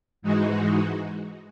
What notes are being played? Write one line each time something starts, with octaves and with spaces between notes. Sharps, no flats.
G#2 E3 G#3 D#4 F#4